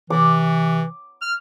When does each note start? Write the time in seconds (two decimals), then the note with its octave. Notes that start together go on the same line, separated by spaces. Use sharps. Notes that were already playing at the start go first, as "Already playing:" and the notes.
0.10 C3 E3 D6
1.21 F6